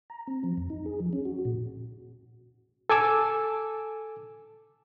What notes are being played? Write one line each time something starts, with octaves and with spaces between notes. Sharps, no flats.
A#5
C4
F3
F2
D#4
G#4
F3
C#4
F#4
A#2
A4 G#5 D6 E6